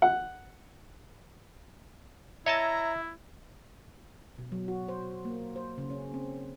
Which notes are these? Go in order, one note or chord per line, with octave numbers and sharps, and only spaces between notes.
F#5
E4 C#5 D#5 E5 A5 A#5
B2
F#3
F#4
C5
A#3
C5
C#3
C#4
C4